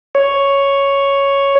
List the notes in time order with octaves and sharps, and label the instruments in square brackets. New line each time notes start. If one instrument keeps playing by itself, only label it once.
[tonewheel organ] C#5